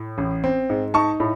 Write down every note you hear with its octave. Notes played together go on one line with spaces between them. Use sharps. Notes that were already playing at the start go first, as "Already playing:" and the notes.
Already playing: A2
A1
C4
G#2
D#4 A5 C#6
A2